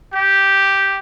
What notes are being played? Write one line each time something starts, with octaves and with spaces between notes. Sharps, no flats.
G4